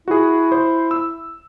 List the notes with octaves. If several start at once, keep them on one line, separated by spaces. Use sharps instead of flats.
E4 F#4 G#4
C5
E6